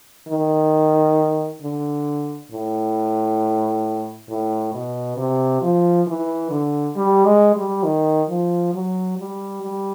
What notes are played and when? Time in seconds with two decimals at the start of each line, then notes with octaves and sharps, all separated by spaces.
0.28 D#3
1.62 D3
2.51 A2
4.30 A2
4.74 B2
5.17 C3
5.62 F3
6.07 E3
6.51 D3
6.96 G3
7.25 G#3
7.55 G3
7.84 D#3
8.29 F3
8.74 F#3
9.18 G3
9.62 G3